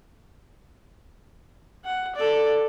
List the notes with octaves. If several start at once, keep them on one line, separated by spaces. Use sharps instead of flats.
F#5
A4 D5